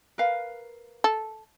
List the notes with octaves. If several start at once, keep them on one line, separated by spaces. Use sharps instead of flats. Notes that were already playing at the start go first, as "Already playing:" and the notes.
A#4 B4 F5
A4